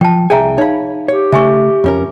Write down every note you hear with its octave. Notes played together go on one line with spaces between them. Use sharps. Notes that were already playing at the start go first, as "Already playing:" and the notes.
F3 G5 A5
C2 G#4 E5 G5 G#5 A#5
D#4 C#5 F5 B5
G4 C#5
C#3 A3 E5 G#5 C#6
F2 C#4 A#4